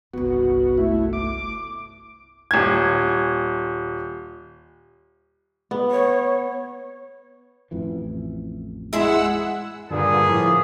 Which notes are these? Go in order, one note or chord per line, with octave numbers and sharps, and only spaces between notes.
G1 C2 B3 F#4
A3 E4
D6
D#1 G#6
B3
C#5
A1 F2 E3
G#3 E4 G#4 C5 F#5 E6
G2 A#2 D3 A#3 B3 G#4
A2 F3